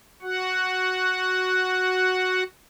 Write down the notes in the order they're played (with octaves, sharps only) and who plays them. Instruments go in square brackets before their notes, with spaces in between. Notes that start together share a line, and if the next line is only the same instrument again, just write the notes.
[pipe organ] F#4 F#5